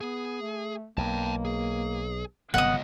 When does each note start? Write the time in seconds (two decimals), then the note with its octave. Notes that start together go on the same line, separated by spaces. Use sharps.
0.01 B3 G#4
0.41 A3
0.97 B1 A#3 G5 A5
1.45 G#4
2.54 G1 C#2 C3 F#3 B3 D#5 F#5 D#6